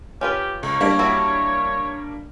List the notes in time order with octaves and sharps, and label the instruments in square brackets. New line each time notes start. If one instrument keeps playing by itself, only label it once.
[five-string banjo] C#4 F4 B4 [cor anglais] G4
[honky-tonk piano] C#2 [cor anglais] C#5
[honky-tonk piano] G3 A#3 D4
[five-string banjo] E4 F#4